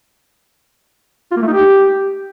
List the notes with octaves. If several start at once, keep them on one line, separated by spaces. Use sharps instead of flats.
F4
A#3
A3
D#4
G4